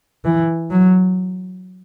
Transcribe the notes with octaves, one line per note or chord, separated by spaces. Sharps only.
E3
F#3